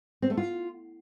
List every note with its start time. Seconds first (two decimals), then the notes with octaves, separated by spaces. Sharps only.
0.22 C4
0.30 A3
0.37 F4